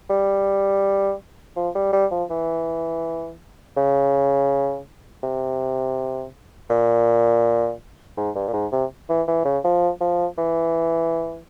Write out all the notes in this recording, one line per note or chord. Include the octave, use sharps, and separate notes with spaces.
G3
F3
G3
G3
F3
E3
C#3
C3
A#2
G#2
G2
A#2
G#2
C3
E3
E3
C#3
F3
F3
E3